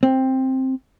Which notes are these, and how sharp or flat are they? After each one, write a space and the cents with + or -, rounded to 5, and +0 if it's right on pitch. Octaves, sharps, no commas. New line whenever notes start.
C4 +10